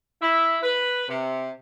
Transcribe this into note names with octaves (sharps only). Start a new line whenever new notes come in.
E4
B4
C3